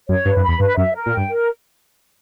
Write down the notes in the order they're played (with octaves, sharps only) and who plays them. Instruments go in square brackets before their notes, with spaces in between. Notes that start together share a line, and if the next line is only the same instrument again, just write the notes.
[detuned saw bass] F#2 [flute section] C#5
[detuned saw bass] G2 [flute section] B4
[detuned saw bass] F#2
[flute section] B5
[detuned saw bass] E2
[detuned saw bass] G2 [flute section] B4
[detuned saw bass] F#2 [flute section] E5
[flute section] A#4
[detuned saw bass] A#2
[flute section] G5
[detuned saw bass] G2
[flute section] A#4